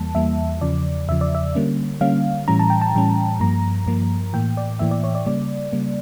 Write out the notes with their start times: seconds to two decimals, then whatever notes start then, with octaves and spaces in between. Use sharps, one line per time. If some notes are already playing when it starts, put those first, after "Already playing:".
Already playing: E2 E3 G3 A#3 A5
0.15 E2 E3 G3 A#3 E5
0.61 E2 C#3 F3 D5
1.08 E2 C#3 F3 E5
1.21 D5
1.35 E5
1.55 D3 G3 A#3 C#4
2.01 D3 G3 A#3 C#4 F5
2.48 A2 E3 G3 C#4 A#5
2.59 A5
2.70 G5
2.82 A5
2.95 A2 E3 G3 C#4
3.40 G2 F3 A#3 A#5
3.86 G2 F3 A#3
4.33 A2 E3 A#3 G5
4.57 D5
4.79 A2 E3 A#3 E5
4.91 D5
5.04 C#5
5.15 D5
5.26 C#3 G3 A#3 D5
5.72 C#3 G3 A#3